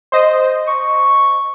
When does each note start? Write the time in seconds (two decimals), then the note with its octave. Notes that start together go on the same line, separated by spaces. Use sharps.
0.12 C5 D#5
0.67 C#6